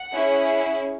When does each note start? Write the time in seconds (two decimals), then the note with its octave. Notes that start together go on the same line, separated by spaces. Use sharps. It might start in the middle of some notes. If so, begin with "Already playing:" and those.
Already playing: F#5
0.12 C#4 E4 G#4